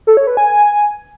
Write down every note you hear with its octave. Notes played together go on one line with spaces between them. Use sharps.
A4
C#5
B4
G#5